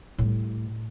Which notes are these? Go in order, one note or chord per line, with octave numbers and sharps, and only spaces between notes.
A2 G3